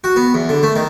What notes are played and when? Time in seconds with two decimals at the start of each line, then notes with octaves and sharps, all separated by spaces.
0.04 F#4
0.16 B3
0.34 E2
0.49 D3
0.63 A3
0.76 D#3